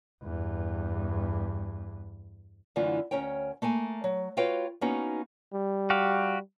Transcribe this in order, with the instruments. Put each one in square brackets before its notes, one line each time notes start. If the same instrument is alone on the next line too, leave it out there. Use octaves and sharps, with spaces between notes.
[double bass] E2 G2
[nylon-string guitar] F#2 D3 E3 A3 F4
D2 C#4 A#4 C#5 G5
A3 A#3 A4 G#5
F#3
F4 F#4 B4 C#5 F5 G5
A#3 B3 C#4 D#4 F#4
[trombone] G3
[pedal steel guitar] F#4 G4 F5